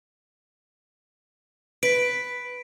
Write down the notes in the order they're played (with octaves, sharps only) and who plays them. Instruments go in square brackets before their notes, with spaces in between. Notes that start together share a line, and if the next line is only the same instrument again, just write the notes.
[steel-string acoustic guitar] B4 [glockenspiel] B6 D7